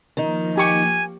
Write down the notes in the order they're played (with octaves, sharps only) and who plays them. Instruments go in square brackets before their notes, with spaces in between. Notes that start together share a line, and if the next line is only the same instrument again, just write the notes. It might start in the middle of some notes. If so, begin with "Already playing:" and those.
[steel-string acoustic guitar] D#3 D#4 [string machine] F3 A#3
[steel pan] G4 C#6 [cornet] G#5